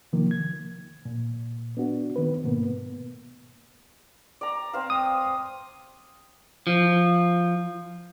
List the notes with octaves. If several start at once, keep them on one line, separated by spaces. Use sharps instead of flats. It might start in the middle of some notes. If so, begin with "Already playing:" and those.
C3 D#3 F3 A#3
G#6
A#2
B3 D4 F#4
D#3 B3 B4
G#2 B2 A#3 B3
D5 A#5
C4 C5 F5
D#6
F3